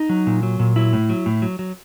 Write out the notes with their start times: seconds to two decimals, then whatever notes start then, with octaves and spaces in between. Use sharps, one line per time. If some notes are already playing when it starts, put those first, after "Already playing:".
Already playing: D#4
0.09 F#3
0.27 A#2
0.43 F#3
0.59 A#2
0.76 F#3 E4
0.93 A2
1.09 F#3
1.26 A2
1.42 F#3
1.59 F#3